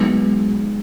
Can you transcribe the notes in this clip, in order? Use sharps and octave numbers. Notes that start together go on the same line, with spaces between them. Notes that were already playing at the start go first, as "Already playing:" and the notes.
Already playing: F#3 G#3 B3 D#4